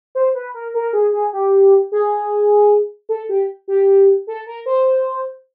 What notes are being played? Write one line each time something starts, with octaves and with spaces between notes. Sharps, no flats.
C5
B4
A#4
A#4
G#4
G#4
G4
G#4
A4
G4
G4
A4
A#4
C5